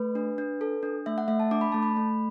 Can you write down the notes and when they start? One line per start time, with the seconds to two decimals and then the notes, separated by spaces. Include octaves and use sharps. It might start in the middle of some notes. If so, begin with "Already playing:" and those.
Already playing: A3 B4
0.15 D4
0.38 D4
0.61 A4
0.83 D4
1.06 A3 E5
1.18 F#5
1.28 A3 E5
1.40 A5
1.51 D4 D6
1.61 B5
1.72 A3 A5
1.83 B5
1.96 A3